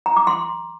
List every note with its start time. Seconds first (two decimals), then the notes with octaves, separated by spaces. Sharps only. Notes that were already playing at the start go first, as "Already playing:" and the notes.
0.06 A#5
0.17 D6
0.27 C6